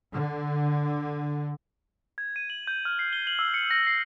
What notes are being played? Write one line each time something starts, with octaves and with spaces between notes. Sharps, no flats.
D3
G#6
D#7
F#7
G6
F6
C7
G7
F#7
E6
C#7
A#6
C7